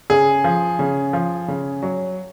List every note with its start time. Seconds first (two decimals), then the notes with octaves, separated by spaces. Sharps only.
0.10 C#3 G#4
0.44 F3
0.79 C#3
1.13 F3
1.48 C#3
1.83 F#3